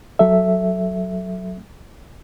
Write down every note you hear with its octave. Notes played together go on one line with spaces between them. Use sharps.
F#3 A4 E5